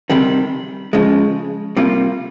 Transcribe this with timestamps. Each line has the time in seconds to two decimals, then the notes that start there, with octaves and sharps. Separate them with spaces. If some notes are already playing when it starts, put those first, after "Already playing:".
0.10 C3 D#3 G3
0.93 C#3 F3 G#3
1.77 C3 G3 A#3 F4